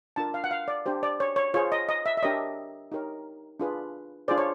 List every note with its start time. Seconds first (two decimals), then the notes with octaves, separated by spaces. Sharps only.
0.16 D4 F4 A#4 A5
0.34 F5
0.44 F#5
0.51 F5
0.68 D5
0.86 D4 G4 C5
1.03 D5
1.20 C#5
1.36 C#5
1.54 F4 G#4 C5 C#5
1.72 D#5
1.89 D#5
2.06 E5
2.17 E5
2.23 D4 G4 A#4 C#5 D#5
2.92 D#4 G4 A#4 C#5
3.60 D4 F4 G#4 B4
4.28 D4 F4 G#4 C5 D5
4.38 C#5